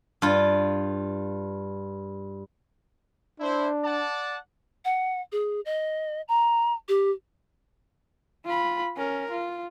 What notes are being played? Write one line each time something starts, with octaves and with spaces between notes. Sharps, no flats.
G2 F4
D4 E4 C5
D5 F#5 A5
F#5
G#4
D#5
A#5
G4
F4 B5
C#4 A#4
F4